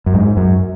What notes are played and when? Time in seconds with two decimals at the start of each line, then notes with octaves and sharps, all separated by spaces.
0.06 F#2
0.14 G#2
0.37 F#2